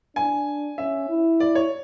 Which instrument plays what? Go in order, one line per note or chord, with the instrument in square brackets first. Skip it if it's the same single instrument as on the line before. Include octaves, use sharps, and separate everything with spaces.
[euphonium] D4 [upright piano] G#5
[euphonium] C#4 [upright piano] E5
[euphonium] E4
[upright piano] D5
C#5